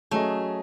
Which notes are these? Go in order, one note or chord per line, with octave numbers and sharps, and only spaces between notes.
F#3 A3 C#4 G#4 D#5